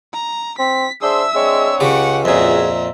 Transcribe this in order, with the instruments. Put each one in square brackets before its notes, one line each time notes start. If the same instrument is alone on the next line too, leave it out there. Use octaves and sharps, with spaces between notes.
[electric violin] A#5
[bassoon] C4 [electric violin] B6
[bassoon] D4 [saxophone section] G#4 C5 [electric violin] E5 E6
[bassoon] G#3 [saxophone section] C4 D4 C#5
[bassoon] C#2 [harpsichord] C#3 G4 [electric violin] F#5 C#6
[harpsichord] F2 A#2 [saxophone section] F#4 G#4 [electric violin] E5 A#5